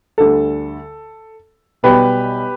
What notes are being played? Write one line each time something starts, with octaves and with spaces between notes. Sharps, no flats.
D2 D3 G3 A4
B1 B2 G3 G4 B4